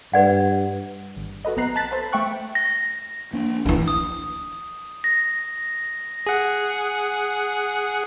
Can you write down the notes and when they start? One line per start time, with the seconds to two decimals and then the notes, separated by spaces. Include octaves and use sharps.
0.14 G2 B4 D5 F#5
1.16 G#1
1.45 F#4 A4 B4 D#5
1.56 B1 B3 C4 A#5 F#6 C7
1.76 A5 F#6 A6 B6
1.91 A4 B4 C5
2.12 G#3 A3 E5 G5 C#6 F#6
2.55 A#6
3.33 A#3 D4
3.66 D2 E3 F3 C4 D4
3.88 D#6
5.04 A#6
6.27 G#4 F#5